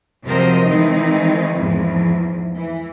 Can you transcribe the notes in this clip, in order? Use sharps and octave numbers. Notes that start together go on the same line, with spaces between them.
C3 F3 F#3 A#4 C5 D#5
D#3 E3 G#3 C4 D#4
E2 G#2 F3
E3